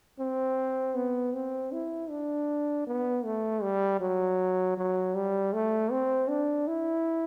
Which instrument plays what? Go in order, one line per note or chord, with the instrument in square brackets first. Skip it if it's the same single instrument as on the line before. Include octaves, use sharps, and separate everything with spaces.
[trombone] C4
B3
C4
E4
D4
B3
A3
G3
F#3
F#3
G3
A3
C4
D4
E4